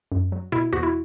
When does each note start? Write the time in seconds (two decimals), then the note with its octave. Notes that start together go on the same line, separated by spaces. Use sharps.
0.12 F#2
0.32 F#3
0.52 B2 E4
0.73 E2 F#4
0.83 E4